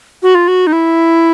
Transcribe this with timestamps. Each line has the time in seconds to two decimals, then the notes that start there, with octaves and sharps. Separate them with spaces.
0.23 F#4
0.35 F4
0.48 F#4
0.67 D#4
0.73 E4